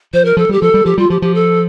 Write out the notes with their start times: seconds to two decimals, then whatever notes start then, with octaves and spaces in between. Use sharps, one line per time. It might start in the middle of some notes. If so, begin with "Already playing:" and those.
0.13 F3 C5
0.25 A#4
0.37 F3 A4
0.49 G3 G4
0.61 F3 A4
0.74 G3
0.85 F3 G4
0.98 G3 F4
1.10 F3 G4
1.22 F3 G4
1.34 A4